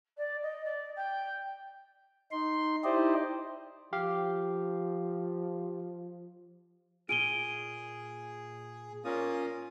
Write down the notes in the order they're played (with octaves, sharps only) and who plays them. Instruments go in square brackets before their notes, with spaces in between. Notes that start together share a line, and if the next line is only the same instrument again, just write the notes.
[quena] D5
D#5
D5
G5
[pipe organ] D#4 C6
D#4 E4 G4 C5 D5 D#5
[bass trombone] F3 [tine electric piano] G4 F5
[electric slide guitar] A#2 F4 [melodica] G#4 [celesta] D7 D#7 G7
[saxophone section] A#2 A#3 [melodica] C#4 D#6